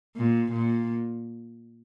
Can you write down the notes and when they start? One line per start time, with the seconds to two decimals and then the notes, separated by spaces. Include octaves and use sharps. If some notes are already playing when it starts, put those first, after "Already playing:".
0.17 A#2
0.52 A#2